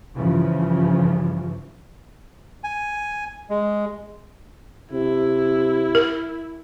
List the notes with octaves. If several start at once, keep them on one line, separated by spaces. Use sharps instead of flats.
G2 C#3 E3 F3
G#5
G#3
C3 E4
A#4